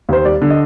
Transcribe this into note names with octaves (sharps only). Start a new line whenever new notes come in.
D#2 C5
G3 D5
D3
D#5